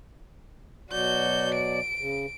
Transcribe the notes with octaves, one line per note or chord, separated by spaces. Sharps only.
B2 F#3 F#4 D5 G6
D7
C#3